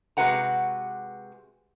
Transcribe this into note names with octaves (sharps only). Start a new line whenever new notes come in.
C3 G#3 F#4 B4 F#5 A#5